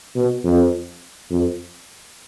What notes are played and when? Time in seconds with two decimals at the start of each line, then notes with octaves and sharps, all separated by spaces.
0.15 B2
0.44 F2
1.31 F2